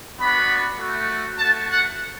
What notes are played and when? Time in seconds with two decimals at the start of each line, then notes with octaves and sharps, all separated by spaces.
0.18 B3 D4 F#4 B5
0.78 A3 F#4
1.38 A3 F#4 A5
1.69 F#5